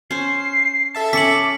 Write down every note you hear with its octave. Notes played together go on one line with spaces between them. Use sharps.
C#4 C5 C7
A4 E5 A5
C#4 D6 B6 C#7 F#7